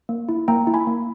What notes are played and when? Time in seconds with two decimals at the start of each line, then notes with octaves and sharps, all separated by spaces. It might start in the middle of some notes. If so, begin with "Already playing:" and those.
0.09 A#3
0.29 E4
0.48 A#3 G5 A#5
0.67 E4
0.74 G#5 B5
0.87 A#3